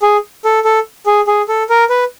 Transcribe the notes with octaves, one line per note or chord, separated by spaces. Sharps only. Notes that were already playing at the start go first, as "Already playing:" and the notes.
G#4
A4
A4
G#4
G#4
A4
A#4
B4